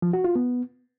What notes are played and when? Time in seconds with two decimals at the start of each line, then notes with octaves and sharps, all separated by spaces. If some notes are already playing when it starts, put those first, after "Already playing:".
0.02 F3
0.13 F#4
0.24 F4
0.35 B3